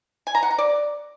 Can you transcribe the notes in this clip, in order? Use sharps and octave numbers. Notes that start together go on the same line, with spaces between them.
G#5
A#5
F#5
A#5
D5